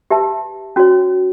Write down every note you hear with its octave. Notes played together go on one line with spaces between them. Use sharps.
G4 B4 E5 A5
C#4 F#4 C#5